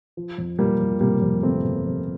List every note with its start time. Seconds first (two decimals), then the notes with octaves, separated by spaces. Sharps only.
0.17 F3
0.38 F2
0.59 F3 G3 A#3
0.79 F2
1.01 C3 G3 A#3
1.22 F2
1.43 G1 A3 C4
1.64 G1
1.85 F2